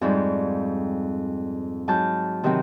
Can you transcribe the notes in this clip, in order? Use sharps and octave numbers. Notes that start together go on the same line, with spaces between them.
F2 G#2 G3
G#2 F#3 A5 F6 G6
C3 D#3 E3 F#3 C4